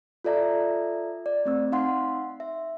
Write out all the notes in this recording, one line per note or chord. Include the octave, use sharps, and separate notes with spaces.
F4 A4 D5 E5 A#5
D5
A3 C4 E6
D#4 F5 F#5 C6
E5